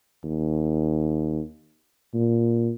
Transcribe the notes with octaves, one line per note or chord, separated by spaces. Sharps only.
D#2
A#2